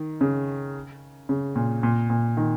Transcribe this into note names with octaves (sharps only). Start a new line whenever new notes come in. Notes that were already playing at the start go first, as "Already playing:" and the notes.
Already playing: D#3
C#3
C#3
A#2
A#2
A#2
D#3